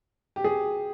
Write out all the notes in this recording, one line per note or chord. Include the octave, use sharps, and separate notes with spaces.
G4
G#4